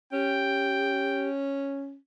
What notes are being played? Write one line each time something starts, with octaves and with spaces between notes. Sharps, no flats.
C#4 G4 G5